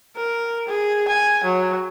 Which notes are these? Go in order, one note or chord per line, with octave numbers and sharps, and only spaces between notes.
A#4
G#4
G#5
F#3